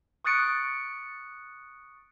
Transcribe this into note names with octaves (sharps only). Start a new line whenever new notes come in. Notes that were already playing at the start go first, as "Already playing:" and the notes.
C#6 D#6 F#6 A6 C#7 D7